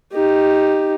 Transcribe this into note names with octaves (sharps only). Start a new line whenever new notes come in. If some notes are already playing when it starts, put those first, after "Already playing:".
D#4 G4